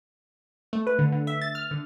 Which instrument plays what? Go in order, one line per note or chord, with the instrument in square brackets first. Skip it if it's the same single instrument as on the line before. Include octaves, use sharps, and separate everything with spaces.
[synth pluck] A3
B4
D3
D3
E5
A6
F6
D3